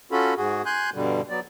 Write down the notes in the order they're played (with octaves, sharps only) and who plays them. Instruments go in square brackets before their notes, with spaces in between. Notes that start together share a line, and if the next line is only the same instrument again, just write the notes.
[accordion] C#4 F4 F#4 A4 B5
G#2 F#4 G#4
G#5 C6 F#6 G6
G2 B2 D3 G3
F#3 B3 D5